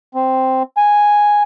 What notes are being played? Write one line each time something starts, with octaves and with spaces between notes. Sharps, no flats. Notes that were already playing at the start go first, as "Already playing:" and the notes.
C4
G#5